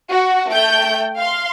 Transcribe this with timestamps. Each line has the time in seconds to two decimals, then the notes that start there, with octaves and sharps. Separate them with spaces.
0.11 F#4
0.51 A3 G5 G6
1.18 F5 C6